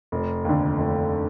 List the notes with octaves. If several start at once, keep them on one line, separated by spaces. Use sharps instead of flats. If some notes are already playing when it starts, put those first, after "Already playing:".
F1
D#2 D3
F1